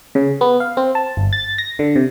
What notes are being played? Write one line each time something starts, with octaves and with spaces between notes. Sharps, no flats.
C#3
B3
F5
C4
A5
G1
A6
A#6
D3
C3